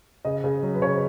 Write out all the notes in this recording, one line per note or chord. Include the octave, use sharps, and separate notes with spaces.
C#3 D#5
C#3
F#3
B4
C#3 C#5